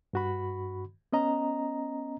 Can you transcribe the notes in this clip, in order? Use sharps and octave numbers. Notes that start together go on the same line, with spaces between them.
G2 F#4 B5
B3 C#4 D#5 A#5